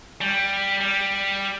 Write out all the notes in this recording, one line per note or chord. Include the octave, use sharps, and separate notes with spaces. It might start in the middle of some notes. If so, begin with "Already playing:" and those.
G3
G3